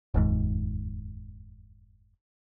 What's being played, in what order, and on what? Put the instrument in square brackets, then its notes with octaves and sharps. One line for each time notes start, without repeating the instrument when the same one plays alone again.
[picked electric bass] F1 D#2 G#2